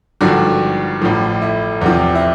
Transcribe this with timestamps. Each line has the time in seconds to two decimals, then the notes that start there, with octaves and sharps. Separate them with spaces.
0.21 G#1 G2 D3 F3 F#4
1.02 A1 A2 F3
1.42 E4
1.81 E2 C3 F3
2.15 E4